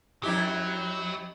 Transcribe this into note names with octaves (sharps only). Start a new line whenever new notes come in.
F2 F#3 E4 G4